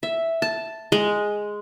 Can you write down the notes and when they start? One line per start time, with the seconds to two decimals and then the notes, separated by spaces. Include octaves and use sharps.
0.03 E5
0.42 A5
0.92 G#3